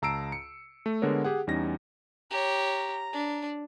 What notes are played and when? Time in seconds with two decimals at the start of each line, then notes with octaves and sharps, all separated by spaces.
0.02 C#2 A5 A#5 E6 C7 D7
0.32 C#7
0.86 A3
1.02 D3 G#3 B3 A#4 C#5
1.25 G4 G#4 F#5
1.47 E2 G3 C#4 D#4 A#6
2.31 G4 C#5 A#5
3.13 D4